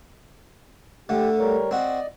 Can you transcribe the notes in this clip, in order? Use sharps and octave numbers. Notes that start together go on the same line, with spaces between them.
D3 A3 G4
G3 A#4 C#5
C4 F#4 D5 D#5